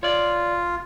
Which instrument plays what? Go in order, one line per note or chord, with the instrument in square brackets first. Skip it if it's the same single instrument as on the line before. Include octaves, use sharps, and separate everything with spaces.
[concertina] F4 [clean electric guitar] C#5 D5